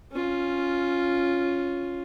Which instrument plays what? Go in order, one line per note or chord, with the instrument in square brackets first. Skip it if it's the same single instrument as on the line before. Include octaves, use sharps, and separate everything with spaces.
[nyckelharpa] C#4 F4